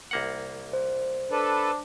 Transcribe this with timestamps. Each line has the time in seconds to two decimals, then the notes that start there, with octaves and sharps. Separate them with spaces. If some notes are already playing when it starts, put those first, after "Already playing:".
0.11 C2 A#3 F#5
0.73 C5
1.31 D4 A4 B4